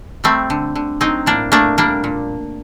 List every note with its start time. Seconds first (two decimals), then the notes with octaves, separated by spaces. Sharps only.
0.24 G3 A3 C4
0.50 D3
0.76 D3
1.00 F#3 C4 D#4
1.26 A2 A#3 D4
1.52 A3 A#3 D4
1.78 G3 A#3 D4
2.04 A#2